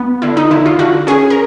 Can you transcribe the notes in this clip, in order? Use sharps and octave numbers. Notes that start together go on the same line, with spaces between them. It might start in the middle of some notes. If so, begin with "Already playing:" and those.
Already playing: B3
D3 E4
D#4
D3 E4
F4
D3 F#4
C#4 G#4
A#4